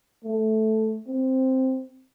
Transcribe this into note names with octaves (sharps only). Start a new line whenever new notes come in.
A3
C4